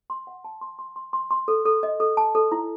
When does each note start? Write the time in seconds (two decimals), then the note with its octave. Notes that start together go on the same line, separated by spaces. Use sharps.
0.10 C6
0.27 F#5
0.44 A5
0.61 C6
0.79 C6
0.96 C6
1.13 C6
1.31 C6
1.48 A4
1.65 A4
1.83 D#5
2.00 A4
2.17 A5
2.35 A4
2.52 E4